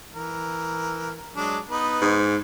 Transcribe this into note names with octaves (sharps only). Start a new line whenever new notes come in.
E3 A#4
F#3 G#3 D4
B3 D#4 B4
G#2